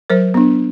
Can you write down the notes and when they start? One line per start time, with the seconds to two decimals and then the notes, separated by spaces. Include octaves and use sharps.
0.10 F#3 A#4 C5
0.34 B3 D4